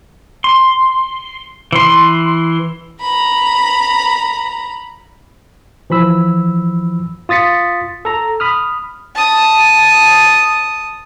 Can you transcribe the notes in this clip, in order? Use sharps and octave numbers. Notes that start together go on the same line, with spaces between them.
C6
E3 C6
A#5 B5
E3 F3 B5 E6
F4 D#6 A6 B6 C#7
A4 A#5
B5 D#6 F6
A5 D#6